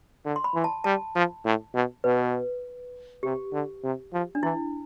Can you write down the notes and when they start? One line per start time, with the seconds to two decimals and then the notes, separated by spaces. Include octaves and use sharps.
0.25 D3
0.36 C6
0.44 B5
0.54 E3
0.64 A5
0.84 G3 A5
1.15 F3
1.45 A2
1.74 B2
2.04 B2 B4
3.23 C3 G4
3.53 D3
3.83 C3
4.13 F3
4.35 D4
4.43 E3 E4